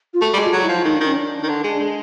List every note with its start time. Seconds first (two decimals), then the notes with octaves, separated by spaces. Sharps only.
0.14 F4
0.21 A3 F#4
0.34 G3
0.37 G#3
0.45 F4
0.53 F#3 F#4
0.63 E4
0.69 F3 F4
0.85 D#3 D#4
0.95 D4
1.00 D#3
1.06 C#4
1.17 D4
1.43 D#3
1.49 D3
1.64 G#3
1.80 G#3